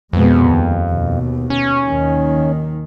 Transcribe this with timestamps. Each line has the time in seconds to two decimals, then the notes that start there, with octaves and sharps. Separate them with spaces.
0.13 F2 B2 G#3 B3
0.48 D#2
0.88 D#2 B2
1.50 C#4
1.88 D#2 D#3